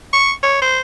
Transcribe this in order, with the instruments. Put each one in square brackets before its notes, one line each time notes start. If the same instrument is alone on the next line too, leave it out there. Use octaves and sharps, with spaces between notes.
[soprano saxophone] C#6
C#5
C5